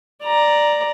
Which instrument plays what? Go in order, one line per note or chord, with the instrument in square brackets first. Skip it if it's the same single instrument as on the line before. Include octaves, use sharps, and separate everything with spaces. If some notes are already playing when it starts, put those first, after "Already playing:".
[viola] D5 A#5